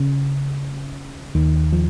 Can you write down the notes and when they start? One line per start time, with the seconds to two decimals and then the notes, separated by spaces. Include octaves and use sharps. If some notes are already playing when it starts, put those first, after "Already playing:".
Already playing: C#3
1.35 D#2 D#3
1.73 F3